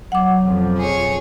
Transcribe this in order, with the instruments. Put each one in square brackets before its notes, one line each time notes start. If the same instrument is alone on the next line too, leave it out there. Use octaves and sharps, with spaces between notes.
[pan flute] F#3 [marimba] F#5 D6
[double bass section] F2 B2 F3
[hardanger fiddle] G#4 C#5